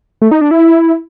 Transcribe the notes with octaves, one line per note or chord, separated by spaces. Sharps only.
A3
D#4
D4
E4